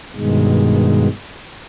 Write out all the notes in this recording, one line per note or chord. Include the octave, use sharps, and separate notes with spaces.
G2 B2 D#3 G#3